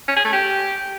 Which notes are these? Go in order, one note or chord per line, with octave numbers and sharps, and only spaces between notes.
C#4
G#4
A3
G4